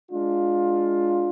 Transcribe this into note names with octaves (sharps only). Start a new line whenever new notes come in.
G#3 D4 F4